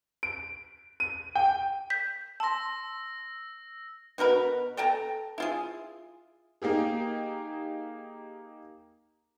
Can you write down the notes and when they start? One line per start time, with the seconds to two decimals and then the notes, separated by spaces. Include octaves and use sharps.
0.23 D7
1.00 D#7
1.35 G5
1.90 G6 B6
2.40 A5 C6 E6 A#6
4.18 B2 F#4 A#4 B4
4.77 A4 G5 A5 A#5
5.38 E4 F4 G#4
6.62 A#3 D#4 G4 G#4